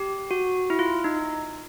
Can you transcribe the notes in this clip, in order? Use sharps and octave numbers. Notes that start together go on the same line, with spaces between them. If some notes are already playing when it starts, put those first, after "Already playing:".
Already playing: G4
F#4
E4
F4
D#4